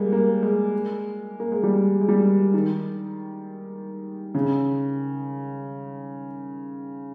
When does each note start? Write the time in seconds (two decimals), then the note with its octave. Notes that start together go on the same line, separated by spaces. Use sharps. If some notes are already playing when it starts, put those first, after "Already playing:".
Already playing: G3 G#3 A#3
0.12 A#3
0.43 G#3
1.40 A#3
1.52 G#3
1.63 G3
2.01 G#3
2.08 G3
2.54 D#3
4.35 C#3